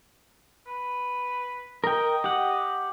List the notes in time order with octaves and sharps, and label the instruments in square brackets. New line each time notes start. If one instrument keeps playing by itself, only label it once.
[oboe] B4
[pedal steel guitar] A#4 G5 [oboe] D#5
[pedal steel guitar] G4 F#5